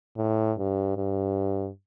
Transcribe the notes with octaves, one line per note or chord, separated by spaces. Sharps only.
A2
G2
G2